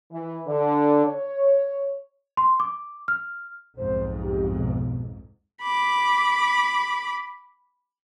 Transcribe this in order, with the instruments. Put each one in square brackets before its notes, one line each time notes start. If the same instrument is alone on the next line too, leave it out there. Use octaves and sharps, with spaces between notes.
[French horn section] E3
D3
C#5
[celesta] C6
D6
F6
[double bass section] B1 F2 G#2 [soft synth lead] C5
[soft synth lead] G4
B2
[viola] B5 D6